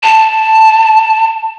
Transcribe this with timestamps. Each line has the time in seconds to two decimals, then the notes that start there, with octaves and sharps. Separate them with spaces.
0.03 A5